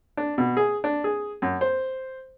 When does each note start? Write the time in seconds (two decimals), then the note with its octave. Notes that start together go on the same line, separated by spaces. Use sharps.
0.17 D4
0.38 B2
0.57 G#4
0.84 D4
1.04 G#4
1.42 F#2
1.61 C5